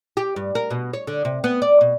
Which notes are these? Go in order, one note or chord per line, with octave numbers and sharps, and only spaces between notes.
G4
G2
A#4
B2
C#5
D3
C3
B3
D5
B2